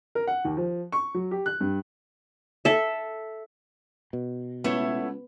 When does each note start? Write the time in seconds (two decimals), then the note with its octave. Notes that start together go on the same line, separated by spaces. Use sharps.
0.15 A#4
0.27 F#5
0.45 D#2
0.57 F3
0.92 C#6
1.14 F#3
1.31 G4
1.46 F#6
1.61 G2
2.65 A4 E5
4.13 B2
4.64 C#2 A3 B3 E4 C#5